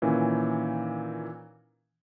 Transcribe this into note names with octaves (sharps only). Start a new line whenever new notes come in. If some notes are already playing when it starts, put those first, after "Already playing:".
A#2 D#3 E3 C#4